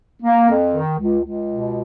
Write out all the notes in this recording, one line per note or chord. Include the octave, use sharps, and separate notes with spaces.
A#3
F2
D#3
C#2
C#2
B2